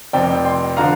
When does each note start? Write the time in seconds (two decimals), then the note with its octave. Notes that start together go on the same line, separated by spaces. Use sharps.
0.13 F1 F2 F3 C4 D5 G5
0.45 G5 C6
0.77 D3 F3 F5 A#5